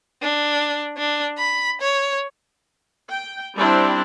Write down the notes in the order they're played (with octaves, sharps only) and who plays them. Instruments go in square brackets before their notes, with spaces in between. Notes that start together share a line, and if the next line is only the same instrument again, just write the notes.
[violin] D4
D4
B5
C#5
[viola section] G5
G3 C4 D4 E4